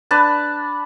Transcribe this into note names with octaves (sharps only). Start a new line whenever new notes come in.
D4 B4 A5